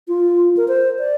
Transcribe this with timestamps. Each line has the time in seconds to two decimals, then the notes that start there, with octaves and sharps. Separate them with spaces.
0.08 F4
0.57 A#4
0.68 C5
0.99 D5